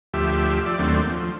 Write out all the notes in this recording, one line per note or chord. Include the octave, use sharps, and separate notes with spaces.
D2 F3 G4 E5
F3 D5
D#2 F#3 A3 C4 D4
F3